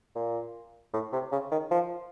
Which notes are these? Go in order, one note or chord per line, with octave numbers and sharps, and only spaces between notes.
A#2
A2
C3
C#3
D#3
F3